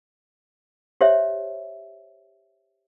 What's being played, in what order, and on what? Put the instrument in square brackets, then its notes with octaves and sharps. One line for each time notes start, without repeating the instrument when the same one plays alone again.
[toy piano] G4 C5 C#5 E5